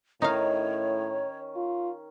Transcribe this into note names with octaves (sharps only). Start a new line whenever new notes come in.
A2 D#3 C#4 D#4 C#5 F5
F4